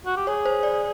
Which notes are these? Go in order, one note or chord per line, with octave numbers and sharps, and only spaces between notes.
F#4
G4
G#4 C#5
C5
D5